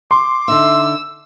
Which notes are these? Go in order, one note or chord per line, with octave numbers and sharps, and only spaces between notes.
C6 D6
D3 D#4 E5 E6